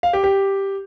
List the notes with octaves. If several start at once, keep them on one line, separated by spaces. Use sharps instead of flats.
F5
G4
G4